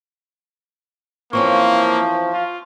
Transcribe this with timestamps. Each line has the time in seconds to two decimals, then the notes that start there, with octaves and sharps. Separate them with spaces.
1.33 E3 F3 A#3 C4 C#4 C#6
2.34 F4